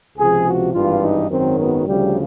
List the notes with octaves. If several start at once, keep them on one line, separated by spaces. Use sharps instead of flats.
C#2 C3 F3 G#4
F#4
G#1 G2 E3 F4
D#4
G#1 F#2 D#3 F#3 C4
B3
D2 C#3 F3 G3